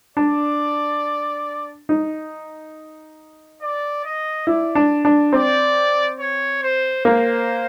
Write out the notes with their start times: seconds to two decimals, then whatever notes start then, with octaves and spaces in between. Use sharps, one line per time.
0.17 D4 D5
1.89 D#4
3.62 D5
4.05 D#5
4.47 E4 D5
4.75 D4
5.05 D4
5.33 C4 D5
6.20 C#5
6.62 C5
7.05 A#3 C5